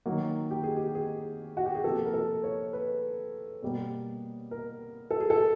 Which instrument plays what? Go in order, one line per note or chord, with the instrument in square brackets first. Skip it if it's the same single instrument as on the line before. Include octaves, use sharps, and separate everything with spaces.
[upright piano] D#3 F#3 A#3 F#4
G4
G#4
G4
G#4
F#4
G4
G#4
C3 F3 A#3 A4
A#4
A4
C#5
B4
B2 G3 A#3
A#4
A4
G#4
A4